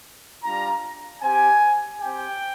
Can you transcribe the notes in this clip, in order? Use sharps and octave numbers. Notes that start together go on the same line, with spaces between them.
G3 D4 F4 A#5
C4 G4 G#5
C4 G4 G5